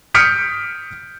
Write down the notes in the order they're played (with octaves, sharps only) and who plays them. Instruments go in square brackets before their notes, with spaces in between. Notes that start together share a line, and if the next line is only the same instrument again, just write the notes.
[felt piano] D#6 F6 G6 B6 C#7 D7